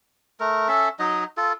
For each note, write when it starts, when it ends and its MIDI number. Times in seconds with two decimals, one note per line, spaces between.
0.40 0.68 57
0.40 0.68 70
0.68 0.89 61
0.68 0.89 69
0.68 0.89 76
0.99 1.24 54
0.99 1.24 63
0.99 1.24 75
1.37 1.53 65
1.37 1.53 69